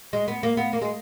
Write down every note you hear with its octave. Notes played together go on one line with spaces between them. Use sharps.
G#3
B3
A#3
B3
A#3
G#3